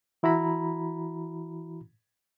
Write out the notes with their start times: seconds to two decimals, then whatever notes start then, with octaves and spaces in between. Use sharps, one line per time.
0.23 E3 E4 F#4 A#5 B5